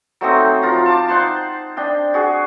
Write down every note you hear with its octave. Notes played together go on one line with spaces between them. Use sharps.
F#3 A3 C4 D#4
F3 F4 A#5
A5 D6
D#4 C5 F#5 C6
D4 D#5 G5
F#4 G#4